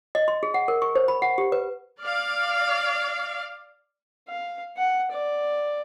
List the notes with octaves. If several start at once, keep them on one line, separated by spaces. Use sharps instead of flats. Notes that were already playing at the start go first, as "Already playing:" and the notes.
D#5
C6
G#4
F#5
A#4
C#6
C5
B5
F#5
G4
B4
D5 F5
F5
F#5
D5